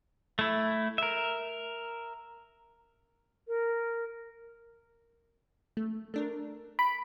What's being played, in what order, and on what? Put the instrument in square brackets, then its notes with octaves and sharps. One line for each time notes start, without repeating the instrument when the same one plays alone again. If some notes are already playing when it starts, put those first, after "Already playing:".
[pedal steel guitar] A3 E4
A#4 E5
[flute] A#4
[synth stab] A3
A3 D4 A#4
[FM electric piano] B5 [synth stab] D7